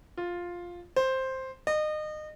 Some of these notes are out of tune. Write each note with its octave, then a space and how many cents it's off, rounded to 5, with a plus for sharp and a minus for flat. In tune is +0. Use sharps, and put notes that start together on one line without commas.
F4 +5
C5 +5
D#5 -30